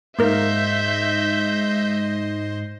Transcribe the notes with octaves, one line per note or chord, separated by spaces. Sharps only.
G#2 A#3 A#4 C5 D#5 E5 G6